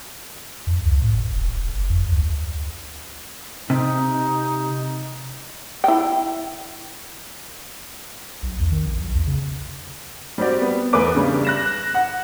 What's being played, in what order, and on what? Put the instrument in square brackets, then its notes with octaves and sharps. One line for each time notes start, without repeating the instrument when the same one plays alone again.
[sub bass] F2
C#2
A2
G1
D#1
F1
F#1
F2
D2
[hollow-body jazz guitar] C3 [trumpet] D#4
[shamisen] E4 G5
[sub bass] B1
E2
D#3
A#1
B1
E2
C#3
[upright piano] G3 C4 F#4 G4 D5
B3
E2 A3 B4 D6
G2 C#3 G3
F#6 A#6 E7
F#5